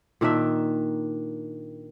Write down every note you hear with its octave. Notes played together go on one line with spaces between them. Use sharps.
A#2 D#3 D4 E5